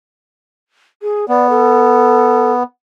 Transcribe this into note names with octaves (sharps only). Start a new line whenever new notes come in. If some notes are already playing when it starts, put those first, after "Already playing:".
G#4
B3 D5
A4